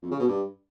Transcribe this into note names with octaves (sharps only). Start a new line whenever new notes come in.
F2
C#3
B2
G2